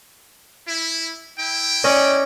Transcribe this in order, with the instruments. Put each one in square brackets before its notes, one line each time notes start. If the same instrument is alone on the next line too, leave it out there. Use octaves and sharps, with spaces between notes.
[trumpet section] E4
E4 G5
[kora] C#4 D5 D#5